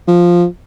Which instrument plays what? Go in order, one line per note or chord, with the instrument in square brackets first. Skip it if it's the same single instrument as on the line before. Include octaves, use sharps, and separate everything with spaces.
[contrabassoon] F3